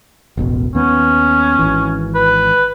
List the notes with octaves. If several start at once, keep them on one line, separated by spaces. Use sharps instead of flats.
E1 A1 B2
D#2 B3 C#4
G#1 E3
B4